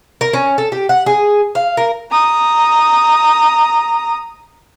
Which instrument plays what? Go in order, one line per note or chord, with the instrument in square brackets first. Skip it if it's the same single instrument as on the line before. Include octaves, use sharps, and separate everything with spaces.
[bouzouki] A#4
C#4
A4
G4
F#5
G#4
F5
A#4
[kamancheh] A#5 D#6